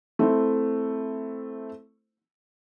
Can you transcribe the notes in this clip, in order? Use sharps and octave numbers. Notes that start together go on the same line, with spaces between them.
A3 C4 E4 C5